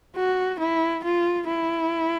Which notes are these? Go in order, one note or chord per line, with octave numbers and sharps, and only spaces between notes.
F#4
E4
F4
E4